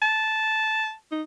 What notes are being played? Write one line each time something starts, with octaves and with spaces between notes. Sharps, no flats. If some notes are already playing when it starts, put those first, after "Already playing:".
A5
D#4